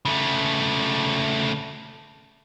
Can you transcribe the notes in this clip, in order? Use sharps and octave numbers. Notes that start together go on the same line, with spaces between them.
C#3 A3